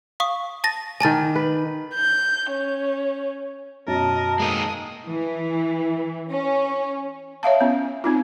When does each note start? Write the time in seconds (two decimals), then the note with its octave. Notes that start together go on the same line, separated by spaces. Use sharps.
0.20 F5 C#6 D#6
0.64 A5 A6 A#6
1.00 D#3 D5 G#5 A5 A6
1.36 B4
1.95 G6
2.52 C#4
3.88 F#2 B2 A#4 D#5 A5
4.40 G#3 A#3 D#4 D#6
5.08 E3
6.31 C#4
7.43 C#5 E5 F5 A5
7.61 B3 C#4
8.04 C4 D#4 F4